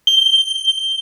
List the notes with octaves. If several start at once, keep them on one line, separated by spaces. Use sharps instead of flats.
G7